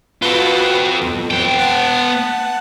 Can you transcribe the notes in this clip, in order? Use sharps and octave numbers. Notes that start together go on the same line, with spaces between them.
F4 F#4 A4 B4
F2
B3 G5
F#5 A5